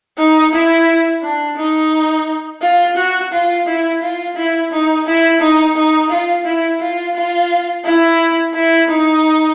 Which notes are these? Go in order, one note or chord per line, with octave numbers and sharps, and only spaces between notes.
D#4
E4
D4
D#4
F4
F#4
F4
E4
F4
E4
D#4
E4
D#4
D#4
F4
E4
F4
F4
E4
E4
D#4